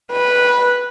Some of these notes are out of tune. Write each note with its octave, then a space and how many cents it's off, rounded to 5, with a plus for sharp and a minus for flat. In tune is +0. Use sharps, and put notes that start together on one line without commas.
B4 -10